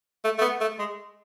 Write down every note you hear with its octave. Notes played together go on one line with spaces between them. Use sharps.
A3
A3
B3
A3
G#3